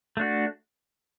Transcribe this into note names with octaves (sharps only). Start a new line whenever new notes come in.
A3 D4 F#4